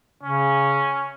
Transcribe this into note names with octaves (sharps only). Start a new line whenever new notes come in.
C#3 C#4